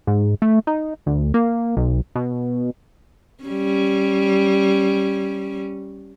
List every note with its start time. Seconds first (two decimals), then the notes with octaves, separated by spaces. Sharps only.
0.07 G#2
0.42 A3
0.67 D#4
1.06 D2
1.34 A#3
1.77 B1
2.15 B2
3.44 G3 C#4